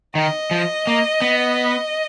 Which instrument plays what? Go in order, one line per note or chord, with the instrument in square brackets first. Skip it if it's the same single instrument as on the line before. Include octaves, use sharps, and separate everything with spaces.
[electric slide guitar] D#3 [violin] D#5
[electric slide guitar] F3
A#3
B3